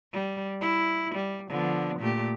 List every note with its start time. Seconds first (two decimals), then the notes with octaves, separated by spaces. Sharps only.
0.13 G3
0.61 E4
1.15 G3
1.49 D3 F3 B3
2.00 A#2 A3 G4